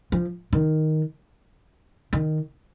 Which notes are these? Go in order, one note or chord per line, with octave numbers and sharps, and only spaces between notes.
F3
D#3
D#3